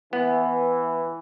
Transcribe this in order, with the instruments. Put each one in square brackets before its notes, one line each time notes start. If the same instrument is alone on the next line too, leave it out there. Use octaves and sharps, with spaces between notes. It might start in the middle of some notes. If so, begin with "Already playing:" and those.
[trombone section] E3 [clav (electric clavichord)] B3